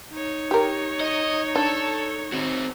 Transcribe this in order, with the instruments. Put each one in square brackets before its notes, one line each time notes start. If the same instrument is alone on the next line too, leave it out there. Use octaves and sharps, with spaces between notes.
[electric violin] D#4 C#5
[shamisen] G4 A#4
[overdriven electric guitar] D#5
[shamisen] D4 [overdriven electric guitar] A4
[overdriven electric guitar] C4 F#4